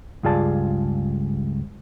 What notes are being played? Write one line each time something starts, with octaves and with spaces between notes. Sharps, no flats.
C#2 G2 F4 G#4 D5 A5